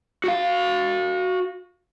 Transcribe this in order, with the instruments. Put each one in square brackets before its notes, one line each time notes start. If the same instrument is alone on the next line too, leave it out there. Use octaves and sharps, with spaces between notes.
[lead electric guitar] F#4 F5